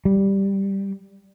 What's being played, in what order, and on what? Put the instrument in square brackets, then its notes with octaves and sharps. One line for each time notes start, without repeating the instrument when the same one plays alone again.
[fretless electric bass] G3